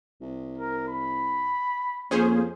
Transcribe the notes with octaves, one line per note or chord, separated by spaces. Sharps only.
C2
A#4
B5
F2 A#3 C#4 G#4 C5